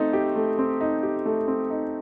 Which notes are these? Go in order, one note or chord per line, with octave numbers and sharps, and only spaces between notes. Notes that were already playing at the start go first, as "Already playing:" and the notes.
Already playing: A3 C4 D#4
G4
A3
C4
D#4
G4
A3
C4
D#4